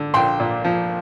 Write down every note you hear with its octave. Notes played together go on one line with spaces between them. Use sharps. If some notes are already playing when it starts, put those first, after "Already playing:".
Already playing: D3
A#1 G5 C6
A#2
F3